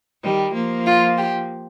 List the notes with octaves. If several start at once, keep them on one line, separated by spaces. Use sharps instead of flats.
D#3 G3
F3 A#3
F4
G4